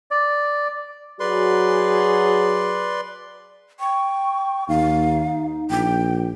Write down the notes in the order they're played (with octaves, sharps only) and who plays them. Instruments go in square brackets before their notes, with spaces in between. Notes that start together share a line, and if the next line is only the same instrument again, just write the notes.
[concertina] D5
[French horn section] F#3 F#4 G#4 [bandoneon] B4 D5 C6
[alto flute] G5 [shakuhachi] C#6
[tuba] D#2 [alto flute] D#4 [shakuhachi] F5
[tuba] A#1 [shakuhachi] G5